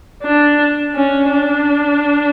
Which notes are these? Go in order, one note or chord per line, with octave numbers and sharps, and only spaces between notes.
D4
C#4
D4